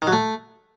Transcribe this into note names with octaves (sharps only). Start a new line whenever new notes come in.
D#3
F#3
A3